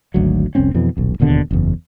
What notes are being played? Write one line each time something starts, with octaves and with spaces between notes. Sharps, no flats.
G#1 D2 F#3
F1 C2 C4 C#4
F2 B2 E3
D#1 B1
D1 D#2 B2 D3
F#1 E2